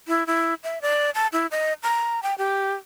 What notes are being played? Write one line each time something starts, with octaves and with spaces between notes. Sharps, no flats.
E4
E4
E5
D5
A5
E4
D#5
A#5
G5
G4